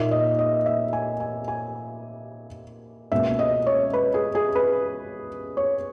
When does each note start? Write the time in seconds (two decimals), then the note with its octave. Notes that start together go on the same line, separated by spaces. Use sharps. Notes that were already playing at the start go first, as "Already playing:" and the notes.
Already playing: A#2 A#3 D#4 E5
0.11 D#5
0.39 D#5
0.66 E5
0.93 G#5
1.20 G#5
1.48 G#5
3.12 C#2 B2 A#3 E5
3.39 D#5
3.67 C#5
3.93 B4
4.14 G#4
4.35 G#4
4.55 B4
5.57 C#5